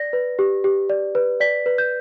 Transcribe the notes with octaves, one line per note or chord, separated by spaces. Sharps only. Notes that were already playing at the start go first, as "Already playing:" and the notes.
Already playing: D5 A#6
B4
G4
G4
D5
B4
D5 B6
B4
G6